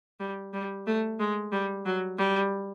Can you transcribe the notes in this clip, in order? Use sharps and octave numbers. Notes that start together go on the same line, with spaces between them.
G3
G3
A3
G#3
G3
F#3
G3